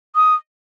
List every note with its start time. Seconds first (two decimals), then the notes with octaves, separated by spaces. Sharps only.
0.15 D#6